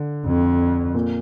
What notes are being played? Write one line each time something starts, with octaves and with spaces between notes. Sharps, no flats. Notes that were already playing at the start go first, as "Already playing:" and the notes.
Already playing: D3
F2
A#2